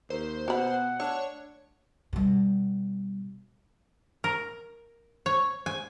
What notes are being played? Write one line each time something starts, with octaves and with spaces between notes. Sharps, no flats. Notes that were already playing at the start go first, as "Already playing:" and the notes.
D#2 C5
B2 F#4 F#5 B5
A3 D4 C#5
B2 G3
A#4
C#5
G#5